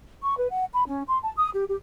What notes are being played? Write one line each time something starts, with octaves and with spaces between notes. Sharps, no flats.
C#6
B4
F#5
B5
C#4
C6
A5
D#6
G4
G4